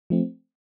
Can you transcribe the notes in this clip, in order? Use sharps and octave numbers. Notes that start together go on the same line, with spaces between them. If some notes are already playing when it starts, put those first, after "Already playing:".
F3 A3 C4